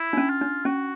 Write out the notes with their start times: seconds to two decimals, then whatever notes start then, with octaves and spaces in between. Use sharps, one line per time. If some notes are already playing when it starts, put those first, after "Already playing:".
Already playing: E4
0.13 D4
0.17 C#4
0.30 F4
0.41 D4
0.65 C#4 F#4